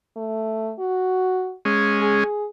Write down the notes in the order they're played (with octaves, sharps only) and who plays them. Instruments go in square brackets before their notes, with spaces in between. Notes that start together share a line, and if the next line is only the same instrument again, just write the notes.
[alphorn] A3
F#4
[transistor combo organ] G#3 C#4
[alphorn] G#4